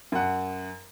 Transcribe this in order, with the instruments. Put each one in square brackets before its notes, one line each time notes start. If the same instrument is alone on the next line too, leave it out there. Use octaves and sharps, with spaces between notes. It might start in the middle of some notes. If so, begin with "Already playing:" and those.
[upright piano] F#2 F#5